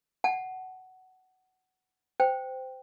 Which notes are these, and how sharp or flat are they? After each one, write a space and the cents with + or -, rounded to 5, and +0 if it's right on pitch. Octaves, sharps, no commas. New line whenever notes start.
F#5 +15 A5 -45
C5 -20 G5 +0